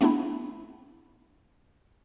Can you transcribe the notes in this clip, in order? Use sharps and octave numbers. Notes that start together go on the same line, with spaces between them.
A3 B3 C4 D4 E4